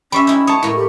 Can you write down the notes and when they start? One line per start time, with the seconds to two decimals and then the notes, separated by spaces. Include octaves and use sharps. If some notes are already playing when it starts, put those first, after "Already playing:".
0.12 G3 C#4 E5 B5 C#6 E6
0.27 D#4 E4
0.47 C#5 A5 D#6
0.63 A2 A#3 E4 C#7
0.75 G4